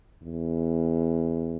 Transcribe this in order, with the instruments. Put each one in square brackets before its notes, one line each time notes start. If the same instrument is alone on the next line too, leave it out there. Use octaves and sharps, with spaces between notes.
[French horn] E2